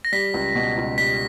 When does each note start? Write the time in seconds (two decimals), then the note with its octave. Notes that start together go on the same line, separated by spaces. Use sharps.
0.05 A#6
0.12 G3 B6
0.34 C#2
0.55 B2
0.77 C#2
0.98 G3 B6